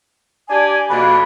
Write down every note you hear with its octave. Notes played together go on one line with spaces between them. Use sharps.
D4 G4 D5 G#5
F2 B2 A#3 D4 F#5 B5